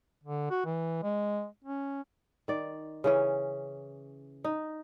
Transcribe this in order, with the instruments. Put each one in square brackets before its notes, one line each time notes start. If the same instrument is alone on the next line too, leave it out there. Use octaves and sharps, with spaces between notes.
[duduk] D3
F#4
E3
G#3
C#4
[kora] D#3 D5
C#3 E3 C#4
D#4